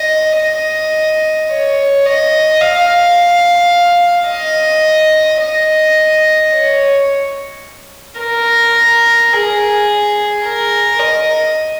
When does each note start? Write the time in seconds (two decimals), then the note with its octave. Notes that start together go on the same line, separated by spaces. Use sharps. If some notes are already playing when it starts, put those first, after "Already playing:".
Already playing: D#5
0.39 D#5
1.50 C#5
2.06 D#5
2.61 F5
4.29 D#5
5.42 D#5
6.53 C#5
8.20 A#4
9.33 G#4
10.45 A#4
10.99 D#5